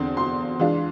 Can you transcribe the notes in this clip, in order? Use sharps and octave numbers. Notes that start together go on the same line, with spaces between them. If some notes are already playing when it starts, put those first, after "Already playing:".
Already playing: E2 D3 C4 C6
C6
E3 G#3 D4 F4